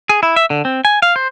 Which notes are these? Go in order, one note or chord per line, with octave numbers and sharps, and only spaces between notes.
G#4
E4
E5
D3
C4
G#5
F5
C5